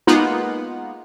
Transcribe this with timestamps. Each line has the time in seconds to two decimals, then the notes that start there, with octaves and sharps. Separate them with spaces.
0.07 G#3 A#3 B3 D#4 F4 F#5